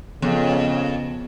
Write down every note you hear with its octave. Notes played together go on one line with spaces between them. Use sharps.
F2 C#3 F3 B3